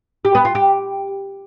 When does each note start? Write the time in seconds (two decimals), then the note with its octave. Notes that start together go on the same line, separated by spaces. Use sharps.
0.25 G4
0.35 B3
0.45 F4
0.55 G4